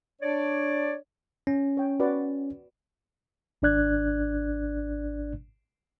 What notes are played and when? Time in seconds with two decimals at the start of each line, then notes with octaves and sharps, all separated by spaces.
0.22 D4 C#5 D5
1.47 C#4
1.77 C#5 G5
2.00 F#4 B4 D5
3.62 G#1 D4 D5 F#6 G#6